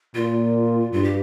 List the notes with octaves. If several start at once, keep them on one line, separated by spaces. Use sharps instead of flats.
A#2 F4
G2 F4
G4